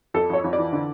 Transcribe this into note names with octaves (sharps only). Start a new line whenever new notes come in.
F2 A4
F2 C#5
F2
D5
E3
D3